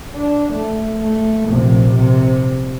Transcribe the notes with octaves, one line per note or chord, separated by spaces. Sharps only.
D4
A3
A3
A#1 C3
C3